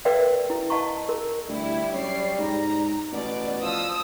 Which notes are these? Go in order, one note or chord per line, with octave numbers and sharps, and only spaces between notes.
A#4 B4 D5 E5 F5 G5
E4
D#5 F5 A5 A#5 C#6
A#4
D2 G3 E4
F#2 C#5 D5 C7
G#2 A#5
A1 B2 D5
F3 D#6 E6